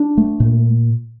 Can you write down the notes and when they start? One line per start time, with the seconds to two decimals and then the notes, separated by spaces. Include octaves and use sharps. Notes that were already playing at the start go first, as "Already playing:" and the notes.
Already playing: D4
0.17 A3
0.40 A#2